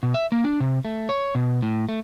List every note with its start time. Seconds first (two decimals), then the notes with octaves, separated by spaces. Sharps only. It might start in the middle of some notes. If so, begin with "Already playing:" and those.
0.03 B2
0.14 E5
0.32 A#3
0.44 D4
0.60 C3
0.85 A3
1.09 C#5
1.35 B2
1.62 A2
1.89 A3